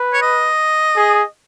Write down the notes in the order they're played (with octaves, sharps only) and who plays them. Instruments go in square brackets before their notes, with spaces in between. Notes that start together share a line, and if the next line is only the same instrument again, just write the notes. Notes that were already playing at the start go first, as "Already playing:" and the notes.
Already playing: [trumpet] B4
[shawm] C#5
D#5
[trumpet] G#4